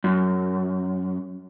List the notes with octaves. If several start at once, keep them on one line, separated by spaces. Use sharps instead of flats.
F#2